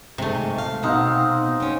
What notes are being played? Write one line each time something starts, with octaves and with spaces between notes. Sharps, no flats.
G#2 C3 G#3 A3 D#4
F5
B2 C4 D#4 F5 F#5
C4 C#4